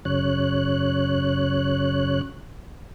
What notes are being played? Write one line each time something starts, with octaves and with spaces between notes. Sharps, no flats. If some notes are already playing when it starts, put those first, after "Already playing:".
F#2 C#3 C#5 F#6